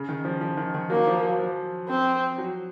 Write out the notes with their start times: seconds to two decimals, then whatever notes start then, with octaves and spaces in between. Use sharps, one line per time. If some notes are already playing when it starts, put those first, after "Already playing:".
Already playing: C#3
0.09 D#3
0.25 F3
0.41 F3
0.57 D#3
0.74 D#3
0.90 F#3 A#3
1.07 F3
1.23 F#3
1.39 F3
1.89 C4
2.38 F#3